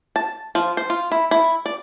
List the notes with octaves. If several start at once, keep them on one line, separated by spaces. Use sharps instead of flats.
A5
F3
C5
F4
E4
E4
D5